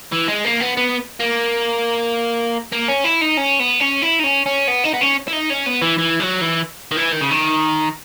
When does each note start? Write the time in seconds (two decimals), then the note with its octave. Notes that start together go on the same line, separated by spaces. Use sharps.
0.12 E3
0.28 G#3
0.44 A#3
0.60 B3
0.77 B3
1.20 A#3
2.73 A#3
2.89 C#4
3.05 E4
3.22 D#4
3.37 C#4
3.60 B3
3.80 C#4
4.02 E4
4.19 D#4
4.24 C#4
4.46 C#4
4.68 B3
4.84 D#4
4.94 B3
5.01 C#4
5.28 E4
5.32 D#4
5.50 C#4
5.66 B3
5.82 E3
5.98 E3
6.20 F#3
6.41 E3
6.92 D#3
6.97 E3
7.12 D#3
7.21 C#3
7.31 D#3